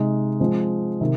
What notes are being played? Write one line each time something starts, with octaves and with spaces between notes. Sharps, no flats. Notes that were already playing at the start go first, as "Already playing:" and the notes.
Already playing: C3 G#3 D#4
F3 G#3 C4
C3 D#3